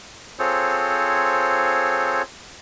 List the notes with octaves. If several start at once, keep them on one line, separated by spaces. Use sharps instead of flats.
C4 F4 G#4 A4 C5 C#5